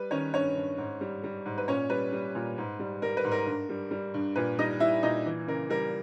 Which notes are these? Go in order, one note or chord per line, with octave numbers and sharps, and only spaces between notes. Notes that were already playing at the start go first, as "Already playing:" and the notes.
Already playing: G3 B4
D#3 C#4 C#5
G2 C#4 C#5
G2
G#2
G3
G3
G#2
B4
A#2 C#4 C#5
G3 B4
G3
A#2
G#2
G3
G3 A#4
B4
G#2
A#4
G2
G3
G3
G2
A#2 B4
G3 D#4 D#5
G3 E4 E5
A#2 D#4 D#5
E3
C#3 A#4
G3 A#4